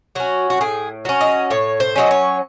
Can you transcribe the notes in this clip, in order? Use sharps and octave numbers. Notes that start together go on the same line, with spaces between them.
F#3 C#4 F#4
F#4
A2 G#4
F#3 C#4
D#5
A2 C#5
C5
F#3 C#4 D#5
C#5